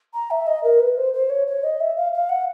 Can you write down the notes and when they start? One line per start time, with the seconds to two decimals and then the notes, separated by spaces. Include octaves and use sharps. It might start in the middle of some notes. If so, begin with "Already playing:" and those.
0.13 A#5
0.30 E5
0.46 D#5
0.63 A#4
0.79 B4
0.97 C5
1.13 C5
1.29 C#5
1.47 C#5
1.63 D#5
1.80 E5
1.96 F5
2.12 F5
2.29 F#5